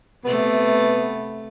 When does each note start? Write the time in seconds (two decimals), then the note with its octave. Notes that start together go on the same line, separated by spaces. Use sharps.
0.25 C3 A3 B3